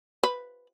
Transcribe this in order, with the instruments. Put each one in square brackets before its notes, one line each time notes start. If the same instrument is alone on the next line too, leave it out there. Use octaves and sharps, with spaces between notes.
[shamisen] B4